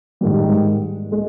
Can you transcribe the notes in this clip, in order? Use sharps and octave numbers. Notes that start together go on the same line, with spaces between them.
G#2 D#3 G3
G#3